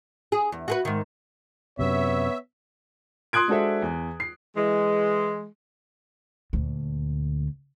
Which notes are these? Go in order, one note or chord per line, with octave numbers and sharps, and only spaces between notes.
G#4
E2
F#4 G#4 B4
G#2 D#3
F#2 C3 B3 C#5 E5
C6 D#6 F#6 G#6 D7
G#3 D4 F#4 A4 C5 E5
E2
C7
E3 G#3
D2 A#2